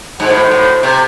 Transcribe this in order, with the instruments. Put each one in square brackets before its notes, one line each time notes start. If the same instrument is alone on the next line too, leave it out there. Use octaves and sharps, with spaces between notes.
[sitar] G#2 [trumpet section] F#4 A4 C5
[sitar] A2
A2
C3